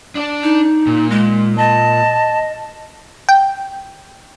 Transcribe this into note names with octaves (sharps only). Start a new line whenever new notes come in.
D4 D5
D#4
A#2
G#3
D#5 A5
G5